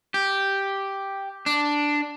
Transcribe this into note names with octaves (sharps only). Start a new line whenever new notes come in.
G4
D4